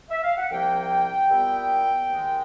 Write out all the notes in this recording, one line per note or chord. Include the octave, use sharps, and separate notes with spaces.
E5
F5
F#5
C2 C3 F3 A#3 G5
A#2 G3 B3 E4
D#2 D#3 G#3